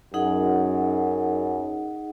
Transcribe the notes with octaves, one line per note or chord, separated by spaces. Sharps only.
F#2 D#4 G#4 D#5 F#5